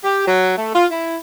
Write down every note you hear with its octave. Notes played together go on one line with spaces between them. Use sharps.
G4
F#3
A3
F4
E4